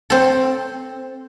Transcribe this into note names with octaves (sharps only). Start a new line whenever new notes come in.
C4 A4